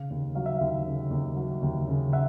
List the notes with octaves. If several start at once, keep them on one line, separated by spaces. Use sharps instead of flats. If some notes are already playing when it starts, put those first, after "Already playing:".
Already playing: C#3 F5
D#2
F#3 F5
E5
D#2 F5
C#3
D#2
F#3
D#2
C#3
E5 F#5